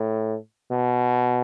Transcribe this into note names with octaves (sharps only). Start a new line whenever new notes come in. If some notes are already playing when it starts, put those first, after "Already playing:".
Already playing: A2
B2